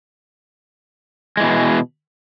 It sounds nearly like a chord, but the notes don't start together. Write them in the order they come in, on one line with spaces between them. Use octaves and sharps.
G#3 E3 B2